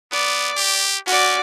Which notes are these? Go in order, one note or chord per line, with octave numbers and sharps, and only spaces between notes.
B3 D5
G4
C#4 F#4 D5